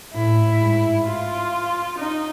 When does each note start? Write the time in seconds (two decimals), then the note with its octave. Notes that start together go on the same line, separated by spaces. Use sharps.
0.14 A2 E4
0.60 G#2
1.06 F4
1.98 D#4